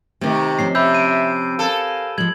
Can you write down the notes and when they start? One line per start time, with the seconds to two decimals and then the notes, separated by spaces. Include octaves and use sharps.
0.21 C3 D#3 A3
0.59 F3 C4 C#4 C7
0.75 C3 E5 B5 E6 G6
0.94 D7 D#7
1.59 A4 A#4 F5 G#5
2.18 F3 G#3 G#6 F#7